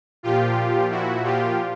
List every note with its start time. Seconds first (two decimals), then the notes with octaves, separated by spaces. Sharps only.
0.23 A#2 F3 F4 G4
0.90 E4 F#4
1.24 F4 G4